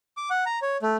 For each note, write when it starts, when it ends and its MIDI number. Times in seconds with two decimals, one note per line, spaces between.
0.17 0.29 86
0.30 0.44 78
0.46 0.59 82
0.62 0.77 73
0.82 0.97 57